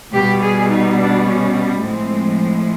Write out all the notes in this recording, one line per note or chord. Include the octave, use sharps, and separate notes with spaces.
B2 G3 G4
G#4
D#4
D4
C#4
C#4
A2 F3 G#3 C4